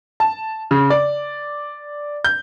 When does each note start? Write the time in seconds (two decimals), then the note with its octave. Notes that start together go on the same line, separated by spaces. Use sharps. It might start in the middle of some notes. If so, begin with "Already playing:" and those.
0.20 A5
0.71 C#3
0.90 D5
2.24 G6